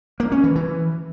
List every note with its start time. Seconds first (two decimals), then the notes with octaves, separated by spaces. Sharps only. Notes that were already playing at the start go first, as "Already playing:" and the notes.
0.20 A#3
0.32 C#4
0.44 E3
0.55 E3